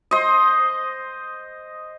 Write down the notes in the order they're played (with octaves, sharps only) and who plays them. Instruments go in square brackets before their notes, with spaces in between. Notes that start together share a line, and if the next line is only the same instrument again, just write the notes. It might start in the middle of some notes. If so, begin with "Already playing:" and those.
[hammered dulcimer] C5 D#5